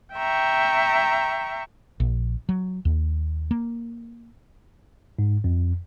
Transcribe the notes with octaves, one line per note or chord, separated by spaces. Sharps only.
E5 G5 A#5 C#6
A#1
F#3
D#2
A#3
G#2
F2